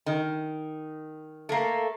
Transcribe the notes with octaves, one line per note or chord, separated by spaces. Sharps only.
D#3
A3 A#3